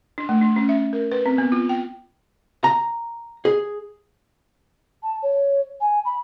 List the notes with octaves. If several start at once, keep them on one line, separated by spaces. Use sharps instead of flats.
D4
A3
D4
C#4
E5
A#4
B4
C4
B3
F4
G5
A#5
G#4
A5
C#5
G#5
B5